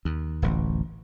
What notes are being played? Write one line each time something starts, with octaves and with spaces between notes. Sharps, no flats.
D#2
D1 A1